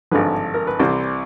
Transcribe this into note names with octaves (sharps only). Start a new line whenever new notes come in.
G#1 G2 D3 F3 B4
A#4
B4
C2 C3 E3 G3 C5